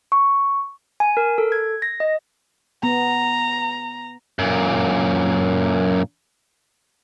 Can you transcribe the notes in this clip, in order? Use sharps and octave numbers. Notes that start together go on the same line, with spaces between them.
C#6
G#5
A#4
A4
G#6
A#6
D#5
B3 A#5
F#2 A#2